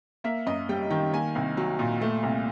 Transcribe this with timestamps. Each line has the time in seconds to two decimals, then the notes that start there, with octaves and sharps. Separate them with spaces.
0.24 A#3 E5
0.46 F#2 D#5
0.69 G3 G5
0.90 D#3 G5
1.13 A#3 G#5
1.35 C2
1.57 F#3
1.79 A#2
2.01 A3
2.23 C2